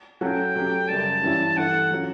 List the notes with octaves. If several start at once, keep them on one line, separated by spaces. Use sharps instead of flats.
F#3 A3 C#4 F#4 A4 G5
F#3 A3 C#4 G4
F#2 C#3 G3 A5
G2 E3 G3 C#4 E4
G2 E3 A3 F#5
F#3 C#4 F#4